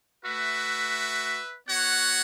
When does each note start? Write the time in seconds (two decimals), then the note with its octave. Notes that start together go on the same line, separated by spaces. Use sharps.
0.25 A3 F#4 B4 E5
1.69 B3 F#4 C#5 F#5